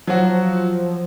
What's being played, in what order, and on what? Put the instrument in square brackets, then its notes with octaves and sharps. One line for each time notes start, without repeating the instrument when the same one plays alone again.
[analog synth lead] F3 [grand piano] F#3 F#4